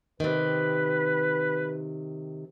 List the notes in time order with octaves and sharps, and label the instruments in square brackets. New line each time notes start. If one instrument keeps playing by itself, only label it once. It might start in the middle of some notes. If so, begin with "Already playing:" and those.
[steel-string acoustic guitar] C3 D#3 [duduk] B4